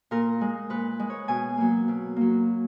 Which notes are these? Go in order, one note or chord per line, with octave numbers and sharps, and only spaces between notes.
A#2 A#4
G#3
A#2 B4
G#3
C#5
B2 G#5
F#3 A#3
B2
F#3 A#3